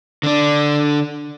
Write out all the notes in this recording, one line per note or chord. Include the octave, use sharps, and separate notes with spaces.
D3 D4